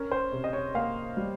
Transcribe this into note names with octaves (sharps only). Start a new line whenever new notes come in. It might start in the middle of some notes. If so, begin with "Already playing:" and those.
Already playing: C#4 A#4
C5
C3
D#5
C#5
A#3 F5
G3